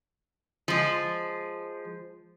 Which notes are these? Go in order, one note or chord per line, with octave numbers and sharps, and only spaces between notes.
F3 G#3